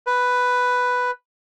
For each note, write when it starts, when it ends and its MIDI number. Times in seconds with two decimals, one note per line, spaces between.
0.07 1.11 71